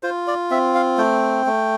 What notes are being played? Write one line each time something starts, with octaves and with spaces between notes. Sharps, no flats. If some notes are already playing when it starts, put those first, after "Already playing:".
F4 C5
D5
C4 E5
F5
A3 G5
A3